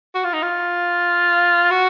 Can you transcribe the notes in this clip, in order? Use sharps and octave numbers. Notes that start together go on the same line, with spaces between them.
F#4
F4
D#4
F4
F#4